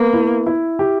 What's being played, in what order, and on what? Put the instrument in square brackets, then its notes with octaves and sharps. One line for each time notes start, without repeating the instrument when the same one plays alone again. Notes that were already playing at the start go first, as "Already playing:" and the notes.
Already playing: [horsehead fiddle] A#3 [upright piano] B3
[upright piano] E4
E4
G4